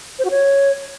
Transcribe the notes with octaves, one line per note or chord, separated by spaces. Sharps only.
C5
F#4
C#5